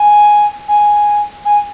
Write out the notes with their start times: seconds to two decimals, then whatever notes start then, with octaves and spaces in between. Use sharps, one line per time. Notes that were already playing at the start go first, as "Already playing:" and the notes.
Already playing: G#5
0.68 G#5
1.45 G#5